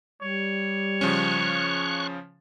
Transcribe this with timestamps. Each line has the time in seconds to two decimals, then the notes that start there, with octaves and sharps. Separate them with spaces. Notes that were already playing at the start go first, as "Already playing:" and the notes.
0.22 G3 C#5
1.01 C#3 F3 C#4 C#6 F#6